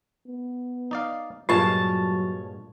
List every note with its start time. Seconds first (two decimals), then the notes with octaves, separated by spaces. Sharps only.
0.27 B3
0.91 D#4 D5 F5
1.49 G2 A#2 F#3 G#3 F4 C#5 A5